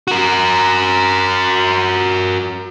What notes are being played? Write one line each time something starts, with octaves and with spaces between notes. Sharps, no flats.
F#4 A#4